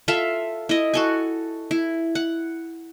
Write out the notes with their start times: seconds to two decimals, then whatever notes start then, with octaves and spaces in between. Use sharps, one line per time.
0.08 F4 A4 E5 F5
0.69 E4 D#5
0.94 F#4 A4 G#5
1.71 E4
2.15 F#5